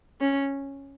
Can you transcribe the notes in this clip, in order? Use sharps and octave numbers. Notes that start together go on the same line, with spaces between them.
C#4